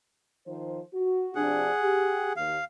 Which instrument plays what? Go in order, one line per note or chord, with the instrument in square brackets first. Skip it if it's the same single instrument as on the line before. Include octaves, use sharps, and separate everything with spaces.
[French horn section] D#3 F3 C5
F#4
[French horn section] C3 F3 D4 [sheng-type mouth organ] G#4 F#5
[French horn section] G4
[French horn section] D#2 [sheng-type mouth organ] F5